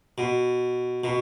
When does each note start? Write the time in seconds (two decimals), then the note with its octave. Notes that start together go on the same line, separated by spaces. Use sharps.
0.18 B2
1.04 B2